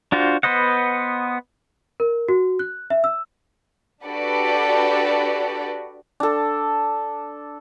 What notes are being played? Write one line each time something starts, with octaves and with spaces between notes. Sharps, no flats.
D4 F4 F#4 C5
B3 B4 C5 D#5 F#5
A#4
F#4
F#6
E5
E6
D4 F#4 G4 A4 B4 D5
D4 A4